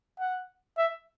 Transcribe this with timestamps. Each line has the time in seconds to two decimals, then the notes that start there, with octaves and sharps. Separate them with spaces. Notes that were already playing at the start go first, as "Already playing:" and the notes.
0.19 F#5
0.78 E5